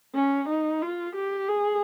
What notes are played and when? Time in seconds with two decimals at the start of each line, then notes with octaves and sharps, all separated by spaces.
0.15 C#4
0.49 D#4
0.82 F4
1.16 G4
1.49 G#4